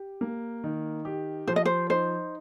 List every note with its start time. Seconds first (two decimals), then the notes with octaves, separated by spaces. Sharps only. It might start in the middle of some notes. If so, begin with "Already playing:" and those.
Already playing: G4
0.21 A#3
0.64 D#3
1.05 G4
1.48 F3 C5
1.56 D#5
1.65 C5
1.90 D#4 C5